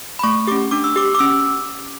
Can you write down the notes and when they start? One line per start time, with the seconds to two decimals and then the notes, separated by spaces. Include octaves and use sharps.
0.19 B5
0.23 A3 C#6
0.47 C#4 G4 D6
0.71 D4 D6
0.84 E6
0.96 G4 D6
1.15 D6
1.19 C#4 E6